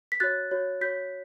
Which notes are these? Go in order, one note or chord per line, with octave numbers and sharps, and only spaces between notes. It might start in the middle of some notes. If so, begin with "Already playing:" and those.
B6
F#4 C#5 F#6 A6
F#4 C#5
F#4 C#5 G6 B6